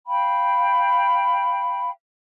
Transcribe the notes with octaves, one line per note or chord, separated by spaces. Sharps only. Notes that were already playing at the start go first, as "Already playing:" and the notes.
F5 G5 B5